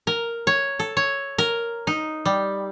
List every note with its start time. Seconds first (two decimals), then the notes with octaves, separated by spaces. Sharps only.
0.07 A#4
0.47 C#5
0.79 A4
0.97 C#5
1.38 A#4
1.87 D#4
2.25 G3